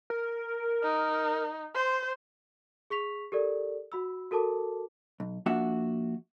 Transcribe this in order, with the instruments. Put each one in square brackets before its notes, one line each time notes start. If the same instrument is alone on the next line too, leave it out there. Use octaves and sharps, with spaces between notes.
[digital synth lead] A#4
[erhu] D#4
[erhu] C5 [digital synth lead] C6
[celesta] G#4 C#6 B6 F7
G4 A4 A#4 D5
F#4 B5 E6
F#4 A4 A#4 A5 D6
[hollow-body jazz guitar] B1
F3 A#3 D4 F#4 E5 F#5